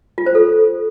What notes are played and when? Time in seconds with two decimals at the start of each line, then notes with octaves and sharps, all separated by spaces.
0.18 F4
0.26 C5
0.35 A4